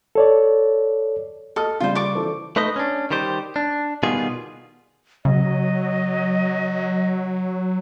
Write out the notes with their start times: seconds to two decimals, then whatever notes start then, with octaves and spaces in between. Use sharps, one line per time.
0.15 A4 C#5 D5
1.56 A4 D#5 D#6 F6
1.80 C#3 G3 F4 C5
1.95 D5 C#6 D6
2.15 E3 A4 C5
2.56 A3 D#4 B4 C5 D#5
2.76 C#4 D4
3.11 D#3 G3 G4 C5
3.56 D4
4.03 B2 D#3 G3 B3 F4 G#4
5.25 C#3 F#3 D#5